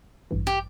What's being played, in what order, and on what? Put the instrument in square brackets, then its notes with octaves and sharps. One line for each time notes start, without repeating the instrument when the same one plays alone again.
[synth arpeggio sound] A1 G2 E3
[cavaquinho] G4